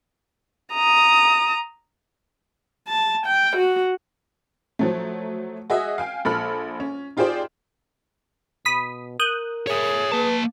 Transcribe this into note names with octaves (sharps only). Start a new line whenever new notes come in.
A#5 D#6
A5
G5
F#4
F3 F#3 A3
F#4 G#4 D#5 E5
F5 G5 G#5
A#1 A4 B5 F6
C#4
D#4 F4 G4 G#4 C5 D5
B2 B5 D#6 B6
A#4 D#6 F#6 G6
G#4 C#5 E5
A#3 B4 A5